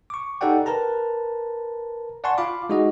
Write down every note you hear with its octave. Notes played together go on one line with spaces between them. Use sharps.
C#6 D6
D#4 G4 A4 D5 F#5 G5
A#4 B4 A5 A#5
D5 F#5 G#5 A5 C6 C#6
F4 F5 B5 D6
G#3 D#4 F#4 G#4 D#5